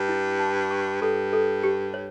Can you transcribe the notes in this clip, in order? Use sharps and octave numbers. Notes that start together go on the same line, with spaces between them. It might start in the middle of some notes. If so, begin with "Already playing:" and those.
Already playing: G2
E4
A5
C#6
G2 A4
A4
G4
C#5